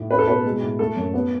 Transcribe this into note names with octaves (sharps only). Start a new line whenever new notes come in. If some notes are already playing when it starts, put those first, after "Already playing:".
Already playing: A2
C#4 B4
A4
B2 B4
G#3
A2
A3 A4
F#2
B3